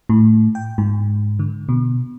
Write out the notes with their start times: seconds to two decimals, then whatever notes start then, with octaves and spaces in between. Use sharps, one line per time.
0.09 A2
0.55 G5
0.78 G#2
1.39 D3
1.69 B2